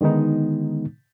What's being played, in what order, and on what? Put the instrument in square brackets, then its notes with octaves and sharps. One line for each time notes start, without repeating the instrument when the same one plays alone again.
[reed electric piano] D3 D#3 G#3 B3 D#4